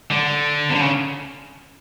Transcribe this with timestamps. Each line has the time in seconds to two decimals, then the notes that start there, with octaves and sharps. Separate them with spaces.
0.11 D3
0.70 C3
0.75 D3
0.80 C#3